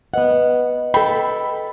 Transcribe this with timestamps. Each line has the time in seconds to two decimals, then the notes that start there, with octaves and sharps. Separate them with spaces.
0.14 B3 B4 D#5 F#5
0.94 A4 G5 B5